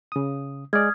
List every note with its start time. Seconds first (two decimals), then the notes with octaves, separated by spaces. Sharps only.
0.12 C#3 D#6
0.73 G#3 D5 D#6 F6 G#6